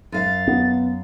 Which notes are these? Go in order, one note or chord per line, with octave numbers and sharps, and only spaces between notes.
F#2 F5 A6
B3